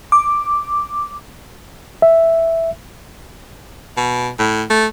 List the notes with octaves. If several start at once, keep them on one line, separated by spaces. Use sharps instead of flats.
D6
E5
B2
A2
A3